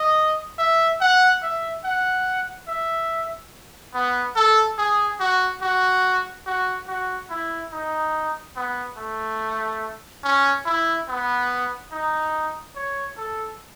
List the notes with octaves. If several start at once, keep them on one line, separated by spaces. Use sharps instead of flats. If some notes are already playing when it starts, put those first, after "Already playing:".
Already playing: D#5
E5
F#5
E5
F#5
E5
B3
A4
G#4
F#4
F#4
F#4
F#4
E4
D#4
B3
A3
C#4
E4
B3
D#4
C#5
A4